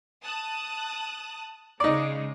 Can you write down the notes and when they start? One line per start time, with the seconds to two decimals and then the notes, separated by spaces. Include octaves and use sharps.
0.24 A5 D#6 F#6
1.80 C#3 G#3 D#4 D5